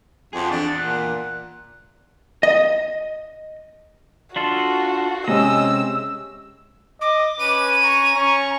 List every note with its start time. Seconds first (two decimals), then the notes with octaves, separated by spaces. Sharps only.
0.33 F2 F#4 G#4
0.51 E2 D4
0.77 A#2 F#5
2.43 D#5
4.36 D4 F4 F#4 A4
5.28 C3 G#3 C#4 D#5 E6
7.01 D#5 D6
7.40 C#4 B4 D#7
7.83 A#5 C#6
8.16 C#4 C#6